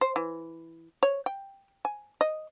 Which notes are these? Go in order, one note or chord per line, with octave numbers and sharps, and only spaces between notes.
C5
E3
C#5
G5
G#5
D#5